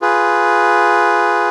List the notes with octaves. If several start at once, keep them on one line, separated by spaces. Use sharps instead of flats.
F4 G#4 B4